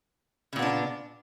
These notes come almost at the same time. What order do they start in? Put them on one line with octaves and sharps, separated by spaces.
C#3 A#2 B3 D4